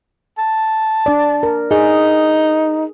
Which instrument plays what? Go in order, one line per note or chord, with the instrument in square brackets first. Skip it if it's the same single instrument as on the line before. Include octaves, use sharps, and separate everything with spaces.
[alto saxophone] A5
[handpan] D4 D5
A#4
[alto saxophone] D#4 [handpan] G#4